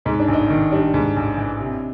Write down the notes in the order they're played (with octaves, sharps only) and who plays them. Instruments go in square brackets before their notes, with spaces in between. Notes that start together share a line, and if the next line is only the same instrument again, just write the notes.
[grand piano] G#2 [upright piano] D#4
[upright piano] D4
[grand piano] A1
[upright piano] D#4
[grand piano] D#3
[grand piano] G3 [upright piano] D4
[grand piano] G#2
A1
E3
C3